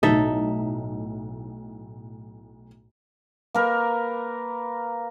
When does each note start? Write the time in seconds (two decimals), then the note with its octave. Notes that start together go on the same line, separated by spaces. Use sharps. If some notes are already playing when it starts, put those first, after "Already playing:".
0.03 B1 A2 D#4 A4 E5
3.55 A#3 A#4 B4